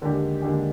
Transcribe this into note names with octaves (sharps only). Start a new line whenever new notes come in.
D#2 D3 G#3 D4 G4
D#2 D3 G#3 D4 G4